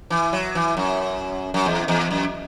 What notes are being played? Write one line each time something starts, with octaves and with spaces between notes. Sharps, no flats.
E3
F#3
E3
F#2
F#2
E2
E2
F#2